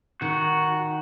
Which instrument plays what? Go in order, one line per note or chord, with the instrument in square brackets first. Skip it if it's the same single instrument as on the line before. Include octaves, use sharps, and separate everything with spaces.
[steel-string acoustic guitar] D#3 [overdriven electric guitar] F#4